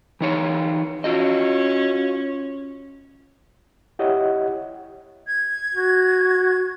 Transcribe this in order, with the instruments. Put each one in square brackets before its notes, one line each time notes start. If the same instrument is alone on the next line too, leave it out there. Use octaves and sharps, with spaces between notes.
[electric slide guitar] E3 D#4 C#5
[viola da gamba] C#4 [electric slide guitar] F4 F#4 D#5
[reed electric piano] E4 G4 C#5 D#5 E5 F#5
[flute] G#6
[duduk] F#4